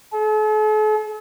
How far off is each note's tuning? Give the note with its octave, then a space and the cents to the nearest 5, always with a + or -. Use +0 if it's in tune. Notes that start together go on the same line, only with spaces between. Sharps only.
A4 -45